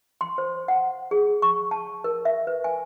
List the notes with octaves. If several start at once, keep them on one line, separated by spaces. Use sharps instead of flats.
C6
C5
F#5
G#4
C#6
A5
A#4
E5
B4
G#5